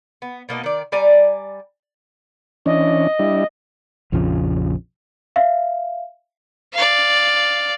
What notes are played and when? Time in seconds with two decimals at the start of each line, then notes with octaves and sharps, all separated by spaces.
0.22 B3
0.49 B2 A#3 D#4 D#5
0.64 D#3 D5
0.92 G3 D5 G#5 A#5
2.66 E3 C#4 D4 D#5
3.19 G3 D4 E4
4.12 A#1 F2 C#3 F3
5.36 E5 F5
6.74 D5 F5